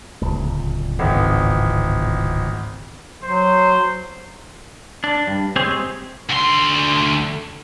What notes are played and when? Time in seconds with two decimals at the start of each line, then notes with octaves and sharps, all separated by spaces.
0.21 D1 C#2
0.99 G#1 E2
3.23 F#3 C5
5.04 D4
5.27 G2
5.56 G#3 C4 G4 G#4 C5 C#5
6.30 D2 C6